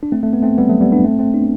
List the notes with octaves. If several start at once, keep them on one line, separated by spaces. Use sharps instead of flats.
D4
A3 C4
A3
B3
A3 C4
G3 B3
F#3 A3
G3 B3
B3 D4
A3 C4
A3 C4
B3 D4